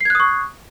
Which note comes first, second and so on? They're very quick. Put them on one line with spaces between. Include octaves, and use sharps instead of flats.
C7 G#6 F#6 D#6 C#6